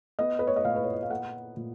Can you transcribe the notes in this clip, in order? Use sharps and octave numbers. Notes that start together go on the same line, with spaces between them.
B3 D#5
B4
C#5
D#5
A#2 F5
B4
C#5
D#5
F5
A#3 F#5
A#2